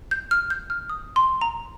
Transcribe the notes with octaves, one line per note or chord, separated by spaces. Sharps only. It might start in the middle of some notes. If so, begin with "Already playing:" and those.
G6
F6
G6
F6
D#6
C6
A#5